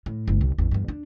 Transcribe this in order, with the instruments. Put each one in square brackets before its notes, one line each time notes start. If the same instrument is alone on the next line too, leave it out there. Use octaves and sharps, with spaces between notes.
[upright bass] A2
F#1 G#3
C2
A1 E2
E2 G2
D4